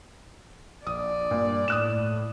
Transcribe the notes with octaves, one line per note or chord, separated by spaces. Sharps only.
A#1 D5 D#6
G2 A#2
A2 D#6 F#6 E7